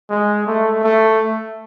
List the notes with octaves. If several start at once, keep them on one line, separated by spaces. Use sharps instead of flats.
G#3
A3
A3